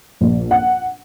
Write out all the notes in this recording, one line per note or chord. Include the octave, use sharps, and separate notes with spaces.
A#1
F#5